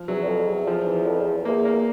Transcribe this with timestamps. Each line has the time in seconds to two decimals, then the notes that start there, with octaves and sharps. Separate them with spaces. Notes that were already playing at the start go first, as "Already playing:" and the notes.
Already playing: F3
0.08 E2 F#3
0.23 E2
0.27 F2
0.48 E2
0.67 F3
0.87 E3
1.06 F2
1.19 E2
1.45 E2 A#3
1.65 A#3